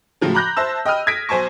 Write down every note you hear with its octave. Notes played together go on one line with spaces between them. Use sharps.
A2 C#3 F3 F#3
A#5 B5 D6 F#6 G6 A#6
C5 E5 A5 E6
D#5 G5 B5 D#6 F6 D#7
D#6 G#6 A#6 B6 D7
B1 C5 G#5 A5 C#6